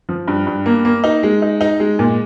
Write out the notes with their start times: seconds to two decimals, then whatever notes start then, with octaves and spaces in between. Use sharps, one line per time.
0.09 F3
0.28 G2
0.47 G2
0.66 A#3
0.85 A#3
1.04 D#4
1.23 G#3
1.42 D#4
1.61 D#4
1.80 G#3
1.99 A#2